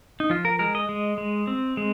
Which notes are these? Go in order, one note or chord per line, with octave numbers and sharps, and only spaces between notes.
D#4
F3 F4
A#4
G#3 A#4
D#5
G#3
G#3
C4
G#3